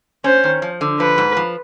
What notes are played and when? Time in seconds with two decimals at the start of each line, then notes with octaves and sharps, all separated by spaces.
0.24 C#4 C5
0.44 D#3
0.62 F3
0.81 D3
0.99 F3 B4
1.18 G#2
1.37 F3